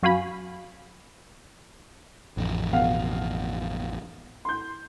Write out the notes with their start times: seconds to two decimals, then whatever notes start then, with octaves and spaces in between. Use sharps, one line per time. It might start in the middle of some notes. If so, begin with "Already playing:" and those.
0.03 F#2 F#4 F5 G#5 B5
2.37 A1 F2
2.73 B2 F5 F#5
4.45 C6 G6